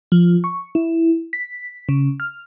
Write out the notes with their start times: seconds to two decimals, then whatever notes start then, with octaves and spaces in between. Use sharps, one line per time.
0.12 F3
0.44 C#6
0.75 E4
1.33 B6
1.89 C#3
2.20 F6